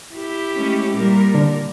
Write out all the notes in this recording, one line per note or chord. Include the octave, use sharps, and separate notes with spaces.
E4 G4
G#3 A3 C#4
A#2 G3 A#4
D3